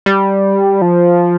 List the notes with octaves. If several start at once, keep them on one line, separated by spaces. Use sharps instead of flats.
G3
F3